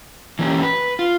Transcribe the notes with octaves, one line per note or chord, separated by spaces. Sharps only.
E3 A#3 C#4 G4
B4
F4